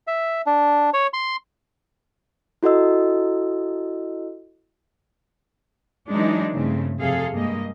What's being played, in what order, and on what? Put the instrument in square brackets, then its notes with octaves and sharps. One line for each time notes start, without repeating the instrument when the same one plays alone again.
[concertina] E5
D4
C#5
C6
[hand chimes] E4 F#4 A4 D#5 E6
[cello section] E3 F#3 G#3 D4 D#4
G2 C#3 A3 C4
F2 C3 G#4 A4 F5
G2 G3 G#3 A#3 D#5